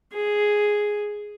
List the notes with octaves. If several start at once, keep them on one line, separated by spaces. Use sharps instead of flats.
G#4